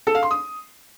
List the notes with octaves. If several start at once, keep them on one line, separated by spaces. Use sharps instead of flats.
A4
F5
C6
D#6